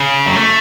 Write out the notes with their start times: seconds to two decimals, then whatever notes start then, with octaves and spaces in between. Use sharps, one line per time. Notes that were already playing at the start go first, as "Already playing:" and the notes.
Already playing: C#3
0.26 F#3
0.36 A3